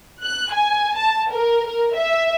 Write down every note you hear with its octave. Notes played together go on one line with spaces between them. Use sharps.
F#6
G#5
A5
A#4
A#4
E5